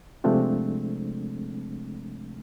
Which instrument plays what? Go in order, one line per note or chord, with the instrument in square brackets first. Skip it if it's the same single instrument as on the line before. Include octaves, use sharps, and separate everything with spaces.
[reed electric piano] C3 F3 G#3 A3 C4 D4